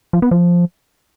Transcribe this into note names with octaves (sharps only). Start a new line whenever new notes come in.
F3
B3
F3